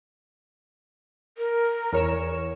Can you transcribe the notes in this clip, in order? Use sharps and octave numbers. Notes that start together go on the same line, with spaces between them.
A#4
E2 C#5 E7